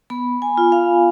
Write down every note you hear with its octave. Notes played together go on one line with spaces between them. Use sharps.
B3 B5
G#5
F4
F5